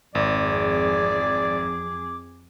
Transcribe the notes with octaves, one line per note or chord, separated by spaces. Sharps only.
G#1 F2 G#4 D5 D6